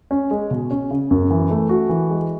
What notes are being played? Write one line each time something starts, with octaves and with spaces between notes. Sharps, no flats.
C#4
G#3
B2
C#4
C#3
F#2
E3
A3
F#4
E3
G#3